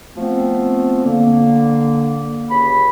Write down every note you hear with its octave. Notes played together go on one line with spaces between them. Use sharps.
F3 A3 B3 C4
D3 A#3
C#2 G4 B5